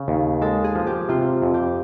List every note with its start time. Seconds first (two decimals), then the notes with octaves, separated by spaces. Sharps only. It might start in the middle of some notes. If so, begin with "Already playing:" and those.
Already playing: C#3
0.08 D#2
0.42 G#3 A4
0.64 G#4
0.75 F3
0.87 G4
1.09 C3 F4
1.42 F2
1.54 G4